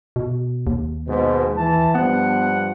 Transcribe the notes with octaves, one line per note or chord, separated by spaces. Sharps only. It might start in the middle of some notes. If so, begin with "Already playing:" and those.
B2
D#2
G#2 B2
E3 A5
G2 F3 B3 F#5